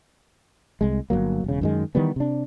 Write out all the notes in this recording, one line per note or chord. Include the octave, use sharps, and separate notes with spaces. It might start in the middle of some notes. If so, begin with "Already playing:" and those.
C2 G#3
G1 E2 F#3 A#3
E1 C#3
F#2 D#3 G#3
D#3 E3 G3 B3
C3 D4